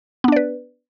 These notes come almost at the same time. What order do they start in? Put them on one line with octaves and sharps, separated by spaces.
B3 D4 D5 B4